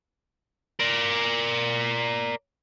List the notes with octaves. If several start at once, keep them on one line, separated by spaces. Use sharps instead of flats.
A#4 D5